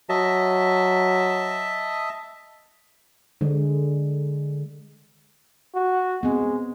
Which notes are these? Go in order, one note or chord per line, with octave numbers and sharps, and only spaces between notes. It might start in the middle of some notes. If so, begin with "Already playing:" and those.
F#3 D#5 E5 A5
D3 G#3
F#4
G#3 B3 C4